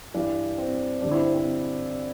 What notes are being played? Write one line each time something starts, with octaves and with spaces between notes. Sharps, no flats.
G2 E3 G3 D4
C4
G2 D3 G3 D4
C4 E4
C4
C4